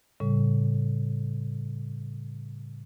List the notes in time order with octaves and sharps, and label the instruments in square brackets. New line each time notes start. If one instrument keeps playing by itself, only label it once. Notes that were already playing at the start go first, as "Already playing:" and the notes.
[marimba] A2 C#3 G3